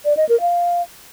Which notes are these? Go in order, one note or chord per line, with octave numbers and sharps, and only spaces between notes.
D5
D#5
A#4
F5